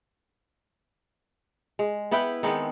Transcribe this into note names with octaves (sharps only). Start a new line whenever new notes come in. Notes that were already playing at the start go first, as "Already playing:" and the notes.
G#3
B3 E4 B4 G5
D#3 G#3 B3 C4